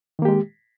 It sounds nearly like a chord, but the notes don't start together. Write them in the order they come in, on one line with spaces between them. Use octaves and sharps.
D#3 A#3 G4 G#3